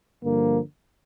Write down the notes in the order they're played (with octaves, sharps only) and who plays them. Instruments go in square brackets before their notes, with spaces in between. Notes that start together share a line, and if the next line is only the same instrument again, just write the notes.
[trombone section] G2 D3 F3 A#3